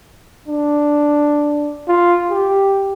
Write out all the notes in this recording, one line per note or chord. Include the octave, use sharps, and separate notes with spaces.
D4
F4
G4